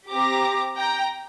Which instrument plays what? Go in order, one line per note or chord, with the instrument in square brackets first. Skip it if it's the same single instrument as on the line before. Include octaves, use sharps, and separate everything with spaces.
[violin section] C4 G4 A#5 D6
G5 A#5